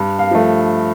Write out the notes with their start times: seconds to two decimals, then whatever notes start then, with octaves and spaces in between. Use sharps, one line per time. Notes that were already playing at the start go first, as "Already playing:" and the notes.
Already playing: G2
0.19 F5
0.31 F3 A3